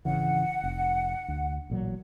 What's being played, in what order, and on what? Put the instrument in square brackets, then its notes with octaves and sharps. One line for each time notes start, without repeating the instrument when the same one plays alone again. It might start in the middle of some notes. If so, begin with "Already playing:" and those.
[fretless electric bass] G#1 C#3 E3 [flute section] F#5
[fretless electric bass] F1
D2
A1 A#2 F#3